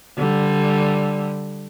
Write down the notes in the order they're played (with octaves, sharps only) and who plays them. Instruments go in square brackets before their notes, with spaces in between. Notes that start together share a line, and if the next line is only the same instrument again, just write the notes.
[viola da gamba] D3 G3